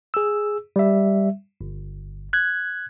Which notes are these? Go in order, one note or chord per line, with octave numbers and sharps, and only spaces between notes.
G#4 E6
G3 E5
G1
F#6 G#6